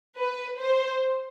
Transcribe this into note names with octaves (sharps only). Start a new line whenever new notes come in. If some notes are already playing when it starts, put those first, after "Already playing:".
B4
C5